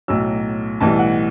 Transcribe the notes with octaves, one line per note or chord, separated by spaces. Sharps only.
B1 A2 F#3 E6
B1 A2 E3 G3 A5
F#5